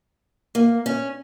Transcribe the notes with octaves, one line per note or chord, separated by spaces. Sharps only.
A#3
C#4